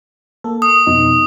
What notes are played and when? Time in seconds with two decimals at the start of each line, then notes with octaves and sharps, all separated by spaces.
0.44 A#3 A4
0.62 D#6
0.87 F2 B2 D#4